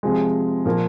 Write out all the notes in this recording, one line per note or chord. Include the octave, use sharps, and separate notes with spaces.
C3 F3 G#3
A#2 F3 A#3